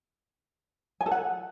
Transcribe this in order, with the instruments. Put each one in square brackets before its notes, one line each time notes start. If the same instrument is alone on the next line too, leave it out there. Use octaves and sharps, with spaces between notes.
[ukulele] G#5
A4
F#5